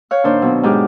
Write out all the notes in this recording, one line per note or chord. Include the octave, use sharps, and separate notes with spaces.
C#5 F5 F#6
A#2 D#3 D4 C5
B2 F#3
G#2 G4 D6 F6